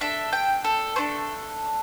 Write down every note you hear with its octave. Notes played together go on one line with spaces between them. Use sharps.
D4 A4 E5
G5
A4
A3 D4 A4 C5